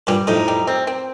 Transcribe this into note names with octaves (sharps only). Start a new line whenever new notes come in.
G2 A#2 G3
F2 A2 D#4
G3
C4
C4